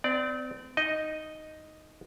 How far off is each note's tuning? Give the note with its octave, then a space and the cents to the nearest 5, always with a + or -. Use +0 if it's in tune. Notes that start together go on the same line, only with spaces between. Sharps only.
C4 -35 D5 +0
D#4 +0 D#5 +0